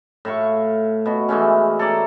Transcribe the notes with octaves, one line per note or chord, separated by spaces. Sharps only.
A2 E5 F5 C#6
B2 F#4
E3 G#3 A3 C#4
A4 C#5 D5 A#5